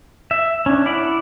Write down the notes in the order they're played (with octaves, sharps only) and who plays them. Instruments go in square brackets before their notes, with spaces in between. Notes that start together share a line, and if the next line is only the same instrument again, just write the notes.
[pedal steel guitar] E5
C#4 D4
E4 D5 F#5